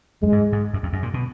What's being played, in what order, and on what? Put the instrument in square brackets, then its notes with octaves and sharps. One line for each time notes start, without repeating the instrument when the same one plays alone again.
[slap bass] F#2 [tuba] G#3
[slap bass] G#2
G#2
F#2
F2
F#2
A#2
B2